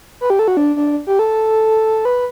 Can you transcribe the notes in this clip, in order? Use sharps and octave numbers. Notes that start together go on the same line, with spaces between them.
B4
G4
A4
F#4
D4
D4
G4
A4
B4